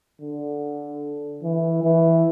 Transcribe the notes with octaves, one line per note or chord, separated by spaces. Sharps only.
D3
E3
E3